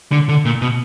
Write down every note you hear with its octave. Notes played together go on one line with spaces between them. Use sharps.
D3
D3
A#2
B2